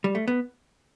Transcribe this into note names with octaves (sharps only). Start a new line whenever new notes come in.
G3
A3
B3